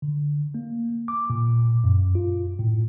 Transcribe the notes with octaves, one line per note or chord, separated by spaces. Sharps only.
D3
A#3
D6
A#2
F#2
F4
A2